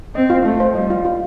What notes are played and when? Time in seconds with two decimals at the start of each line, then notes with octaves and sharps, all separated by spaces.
0.15 C4 D#5
0.30 F4
0.45 A3 F4
0.60 C5
0.75 G3 D#5
0.90 F4
1.05 F4